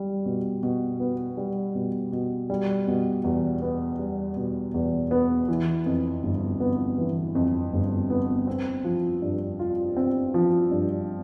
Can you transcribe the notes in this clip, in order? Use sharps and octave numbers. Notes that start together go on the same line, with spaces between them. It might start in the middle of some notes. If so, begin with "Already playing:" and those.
Already playing: G3
B2
B2
B3
G3
B2
B2
G3
B2
E2
B3
G3
B2
E2
B3
E3
F2
G1
B3
E3
F2
G1
B3
C4
F3
G2
F4
C4
F3
G2